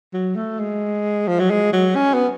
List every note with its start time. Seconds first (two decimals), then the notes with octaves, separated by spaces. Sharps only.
0.14 F#3
0.36 A3
0.59 G#3
1.28 F3
1.39 F#3
1.50 G#3
1.73 F#3
1.96 C#4
2.14 B3